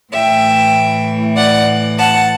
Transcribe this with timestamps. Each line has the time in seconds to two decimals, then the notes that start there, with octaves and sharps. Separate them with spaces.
0.13 A2 E3 E5 G5
1.35 D5 F#5
1.97 F#5 A5